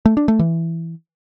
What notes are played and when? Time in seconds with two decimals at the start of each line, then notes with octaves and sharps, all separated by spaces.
0.06 A3
0.17 D4
0.28 A3
0.39 E3